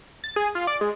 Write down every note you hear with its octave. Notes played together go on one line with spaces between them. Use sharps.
A6
G#4
F4
D5
G#3